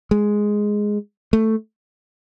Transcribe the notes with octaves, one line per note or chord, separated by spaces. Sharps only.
G#3
A3